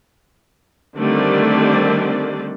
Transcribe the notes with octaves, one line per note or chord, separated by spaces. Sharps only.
D3 D#3 G3 A3 C4 D5